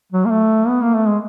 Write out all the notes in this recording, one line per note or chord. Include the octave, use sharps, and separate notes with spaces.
F#3
A#3
A3
B3
A#3
A3
G#3